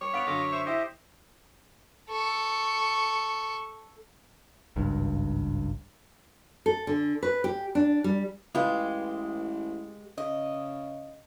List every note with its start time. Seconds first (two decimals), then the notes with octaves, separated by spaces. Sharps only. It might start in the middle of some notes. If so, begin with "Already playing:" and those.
0.01 G3 C#5 D6 C#7
0.13 B3 F5 F#5 B6 D7 F7
0.27 F#2 D3 F4 D#5 D6
0.52 C5 E5 C#6
0.66 E4 G4 C5 D#5 E5
2.10 A4 C#6
4.76 G#1 C#2 G2
6.66 A4
6.87 D3
7.23 B4
7.44 G4
7.75 D4
8.04 G3
8.55 A1 G#3 F4 G4 B4
10.18 C#3 D#5